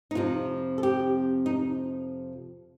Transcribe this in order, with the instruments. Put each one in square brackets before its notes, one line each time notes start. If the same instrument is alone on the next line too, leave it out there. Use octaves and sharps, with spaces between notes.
[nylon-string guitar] D#4
F2 C3 F3 F4
A4
G4
D#4